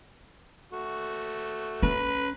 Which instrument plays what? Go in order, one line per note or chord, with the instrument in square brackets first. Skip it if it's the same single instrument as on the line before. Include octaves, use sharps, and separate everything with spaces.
[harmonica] A3 F#4
[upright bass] C#4 [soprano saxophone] B4